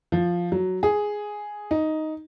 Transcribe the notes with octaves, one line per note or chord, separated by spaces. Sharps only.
F3
F#3
G#4
D#4